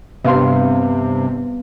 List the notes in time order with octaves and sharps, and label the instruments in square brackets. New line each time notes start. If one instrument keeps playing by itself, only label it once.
[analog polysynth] G2 C3 [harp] B3 F5 C6